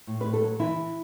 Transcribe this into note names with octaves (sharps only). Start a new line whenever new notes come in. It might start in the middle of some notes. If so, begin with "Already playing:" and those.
A2
B4
A2
A4
F#3
E3 E4
E3